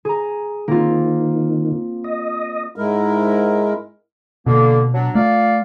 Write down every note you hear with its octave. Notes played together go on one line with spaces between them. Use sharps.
G#4 A#5
D#3 A#3 C4 F4
D#5
G#2 G#3 E4 A#4
B2 D3 A#3
F#3 D4
A3 F4 D5 F5